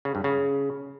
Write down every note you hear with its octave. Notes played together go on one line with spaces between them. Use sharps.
C#3
G2
C#3